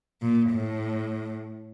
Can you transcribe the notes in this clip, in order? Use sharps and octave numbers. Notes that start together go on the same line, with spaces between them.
A#2
A2